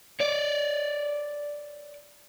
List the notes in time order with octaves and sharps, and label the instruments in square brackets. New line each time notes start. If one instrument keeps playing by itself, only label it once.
[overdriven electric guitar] C#5 D5